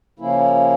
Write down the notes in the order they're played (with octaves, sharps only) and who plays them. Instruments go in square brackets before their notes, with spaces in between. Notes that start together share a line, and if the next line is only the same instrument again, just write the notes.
[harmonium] C#3 F3 A#3 C#4 E4